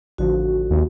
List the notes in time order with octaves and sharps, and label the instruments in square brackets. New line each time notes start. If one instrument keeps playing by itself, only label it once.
[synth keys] A1 D3 F3 [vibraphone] F#4
[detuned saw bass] D#2